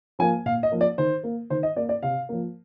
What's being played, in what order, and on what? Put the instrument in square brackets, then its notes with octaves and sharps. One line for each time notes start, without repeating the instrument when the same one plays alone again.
[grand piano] F3 A#3 G#5
A#2 F5
D#5
F3 A#3
D5
D#3 C5
A#3
D#3 C5
D#5
A#3 D5
D5
C3 F5
F3 A#3